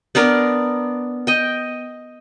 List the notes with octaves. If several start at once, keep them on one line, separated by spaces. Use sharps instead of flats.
B3 D4 A#4 D5
D#5 G5